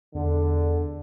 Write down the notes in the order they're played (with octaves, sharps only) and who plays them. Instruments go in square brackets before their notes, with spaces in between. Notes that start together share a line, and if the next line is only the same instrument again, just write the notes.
[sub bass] E2 [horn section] D3